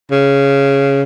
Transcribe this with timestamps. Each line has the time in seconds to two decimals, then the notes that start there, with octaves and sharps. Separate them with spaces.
0.12 C#3